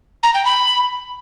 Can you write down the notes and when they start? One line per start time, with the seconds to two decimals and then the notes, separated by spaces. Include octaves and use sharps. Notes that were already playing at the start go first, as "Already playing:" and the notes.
0.23 A#5
0.34 G5
0.45 B5